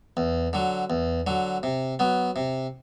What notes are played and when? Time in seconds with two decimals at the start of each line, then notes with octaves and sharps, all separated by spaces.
0.17 E2
0.53 D3 F#3
0.90 E2
1.27 D3 F#3
1.63 C3
1.99 F#3 B3
2.36 C3